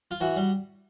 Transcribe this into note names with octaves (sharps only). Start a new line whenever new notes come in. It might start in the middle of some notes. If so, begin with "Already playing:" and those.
F4
E3 F#4
G3